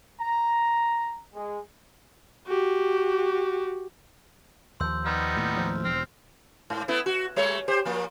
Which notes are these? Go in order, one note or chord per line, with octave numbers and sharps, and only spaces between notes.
A#5
G#3
F#4 G4
D#2 F3 C6 E6 G6
G3 B3 D#4 F6
D#2 A2
F3
E1 C4 F6
G#2
A3 B3 E4
F#4
G3 A3 C#5
G4 C5
F3 A#3